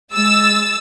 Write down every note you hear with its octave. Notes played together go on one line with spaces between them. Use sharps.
G#3 E6 A6